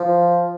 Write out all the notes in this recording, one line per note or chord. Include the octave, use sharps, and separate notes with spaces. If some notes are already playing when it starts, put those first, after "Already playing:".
Already playing: F3